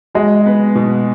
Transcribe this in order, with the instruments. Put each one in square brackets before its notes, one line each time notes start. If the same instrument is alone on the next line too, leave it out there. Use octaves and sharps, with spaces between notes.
[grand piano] G#3 [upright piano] F#4
[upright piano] B3
B2